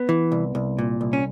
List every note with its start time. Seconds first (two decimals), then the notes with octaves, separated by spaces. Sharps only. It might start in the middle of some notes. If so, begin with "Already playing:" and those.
Already playing: B3
0.09 E3
0.32 C2
0.55 C2
0.79 A#2
1.01 C2
1.13 C#4